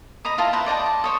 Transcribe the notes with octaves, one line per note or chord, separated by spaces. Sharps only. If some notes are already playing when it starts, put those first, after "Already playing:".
D#5 A#5 B5 D#6
E4 F4 D#5 A5
E4 B4 C5 A#5
D5 D#5 G5 A5
A5
C5 C#5 D#6